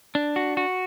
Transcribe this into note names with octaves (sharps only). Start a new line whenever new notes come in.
D4
F#4
F#4